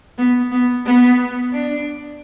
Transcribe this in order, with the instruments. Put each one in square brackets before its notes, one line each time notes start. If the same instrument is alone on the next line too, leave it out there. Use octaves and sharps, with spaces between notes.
[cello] B3
B3
B3
D4